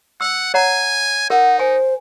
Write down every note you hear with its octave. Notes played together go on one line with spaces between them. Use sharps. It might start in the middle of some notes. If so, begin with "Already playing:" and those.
F#5 E6
C#5 F#5 G#5 A#5
D#4 A#4 F#5
C5 G#5